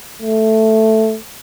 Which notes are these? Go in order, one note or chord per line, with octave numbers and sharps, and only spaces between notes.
A3